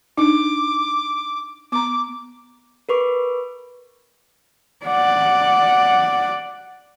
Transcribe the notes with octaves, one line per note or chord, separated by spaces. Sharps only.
D4 D#4 D6
B3 A#5 D6
A#4 B4 C#6 D6
D5 F#5